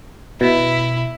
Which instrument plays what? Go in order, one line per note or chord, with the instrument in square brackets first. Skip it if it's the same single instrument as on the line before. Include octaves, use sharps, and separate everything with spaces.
[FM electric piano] B2 [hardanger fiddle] E4